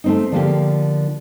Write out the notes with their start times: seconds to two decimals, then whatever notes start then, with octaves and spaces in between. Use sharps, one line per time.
0.04 A3 C4 D#4
0.32 D3 F3 A#3 G4